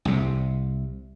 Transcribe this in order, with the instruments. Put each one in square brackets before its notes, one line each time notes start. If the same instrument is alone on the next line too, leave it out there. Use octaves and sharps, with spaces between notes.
[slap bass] C2 C3